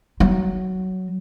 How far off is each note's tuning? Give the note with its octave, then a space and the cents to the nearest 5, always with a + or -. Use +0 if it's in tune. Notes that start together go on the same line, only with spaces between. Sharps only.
F#3 +10